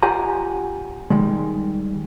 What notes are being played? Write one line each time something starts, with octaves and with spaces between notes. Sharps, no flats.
F4 G4 F#5 G#5 A#5
D#3 G3 G#3